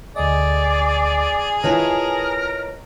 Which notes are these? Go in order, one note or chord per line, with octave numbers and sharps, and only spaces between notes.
D2 G#4 D5 D#5
E4 F4 A#4 B4 C#5 D#5 A5